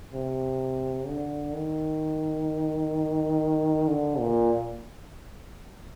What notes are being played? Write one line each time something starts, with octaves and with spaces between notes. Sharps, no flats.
C3
D3
D#3
D3
A#2